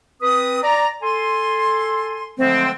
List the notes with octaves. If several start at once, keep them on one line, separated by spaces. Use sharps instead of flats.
C4 B4 D#6
D5 A#5
A4 G#5 C6
D3 F3 F#3 G#3 A3 C4